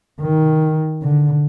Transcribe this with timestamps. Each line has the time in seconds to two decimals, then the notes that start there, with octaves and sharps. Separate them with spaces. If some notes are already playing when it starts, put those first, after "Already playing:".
0.21 D#3
1.02 D3